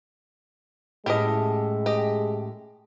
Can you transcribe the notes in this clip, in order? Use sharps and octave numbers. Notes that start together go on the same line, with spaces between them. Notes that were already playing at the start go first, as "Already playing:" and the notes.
A2 G#3 C#4 E4 G4 D#5
G4 D#5